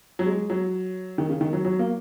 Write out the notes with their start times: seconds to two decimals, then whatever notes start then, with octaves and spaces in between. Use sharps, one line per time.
0.19 F#3
0.26 G#3
0.50 F#3
1.18 D#3
1.30 C#3
1.41 D#3
1.53 F#3
1.65 F#3
1.79 A#3